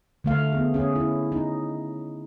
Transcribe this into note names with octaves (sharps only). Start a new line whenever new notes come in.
D3 A3 F5
B3 G#4
C#4 G#4
E4
D#4